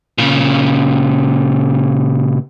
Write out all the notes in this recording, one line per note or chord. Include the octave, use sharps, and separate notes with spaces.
A#2 C#3